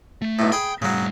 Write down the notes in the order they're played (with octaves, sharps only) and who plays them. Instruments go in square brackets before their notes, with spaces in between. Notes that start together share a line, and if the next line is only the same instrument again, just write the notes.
[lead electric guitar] A3
[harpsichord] B1 A2
[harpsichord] G#4 B5 [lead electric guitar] G5
[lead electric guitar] A2 G3 [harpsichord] C#3 F#3